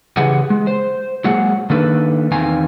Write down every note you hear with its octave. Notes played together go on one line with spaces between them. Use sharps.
C#3 E3 G4 G#4 F#5
G#3
C5
F#3 G#3 A#3 G#4 F#5
D#3 A#3 D4 A4 B4
E2 D#3 C4 F5 G#5 A#5